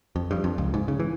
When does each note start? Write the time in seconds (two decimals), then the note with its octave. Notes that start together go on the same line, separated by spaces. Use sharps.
0.16 F2
0.31 G2
0.44 F2
0.58 C#2
0.74 G#2
0.88 C#3
1.00 E3